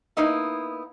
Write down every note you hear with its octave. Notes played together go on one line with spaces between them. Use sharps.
A#3 B3 D#4 E4